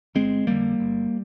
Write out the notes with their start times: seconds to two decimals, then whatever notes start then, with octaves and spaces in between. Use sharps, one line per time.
0.15 G1 G#3 C4
0.47 F2 D3 G3 A#3
0.80 G1